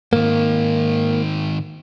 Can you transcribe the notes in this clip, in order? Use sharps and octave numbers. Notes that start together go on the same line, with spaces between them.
G#2 D#3 A#3